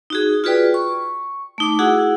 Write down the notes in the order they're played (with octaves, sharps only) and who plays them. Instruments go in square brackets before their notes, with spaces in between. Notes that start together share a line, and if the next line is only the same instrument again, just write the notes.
[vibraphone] D#4 F#4 G#4
F4 F#4 G#4 B4 D5 G5
C#6
A3 D#4 D6
E4 F#4 G#4 F#5